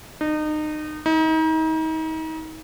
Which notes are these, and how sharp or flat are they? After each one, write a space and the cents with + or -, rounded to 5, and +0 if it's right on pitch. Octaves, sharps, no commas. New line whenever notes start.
D#4 -30
D#4 +35